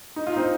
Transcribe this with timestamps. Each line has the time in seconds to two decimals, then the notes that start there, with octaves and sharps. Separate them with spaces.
0.16 D#4
0.27 F4
0.36 C4 D#4